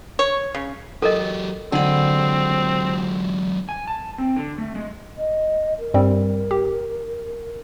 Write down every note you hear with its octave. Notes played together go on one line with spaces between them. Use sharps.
C#5
C#3
F#3 G4 A4 A#4 D#5
D3 F#3 G#3 C4 B5
G#5
A5
C4
D3
A3
G#3
D#5
A#4
G2 G3 C4
G4